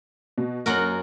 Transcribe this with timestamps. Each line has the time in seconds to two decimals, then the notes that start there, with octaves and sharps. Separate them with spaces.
0.38 B2
0.66 F#1 F#2 F#4 A#4 F#7